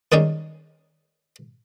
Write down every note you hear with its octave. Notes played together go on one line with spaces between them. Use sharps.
D#3 G3 G#3 C#4 D#4 G4